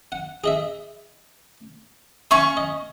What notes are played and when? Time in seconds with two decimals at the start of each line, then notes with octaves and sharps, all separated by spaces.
0.12 F#5
0.44 G#4 D#5 E5
2.31 C#4 E5 G#5 C#6
2.57 D#5